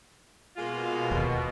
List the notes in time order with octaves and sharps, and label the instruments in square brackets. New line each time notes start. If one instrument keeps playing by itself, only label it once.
[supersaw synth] B2 [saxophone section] G#3 A#3 F4
[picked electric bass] D1 D#2